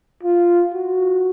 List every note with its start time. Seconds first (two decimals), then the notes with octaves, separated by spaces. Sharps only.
0.23 F4
0.74 F#4